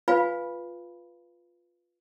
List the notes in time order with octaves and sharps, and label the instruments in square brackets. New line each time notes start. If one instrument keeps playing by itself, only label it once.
[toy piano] F4 B4 F5 G#5 B5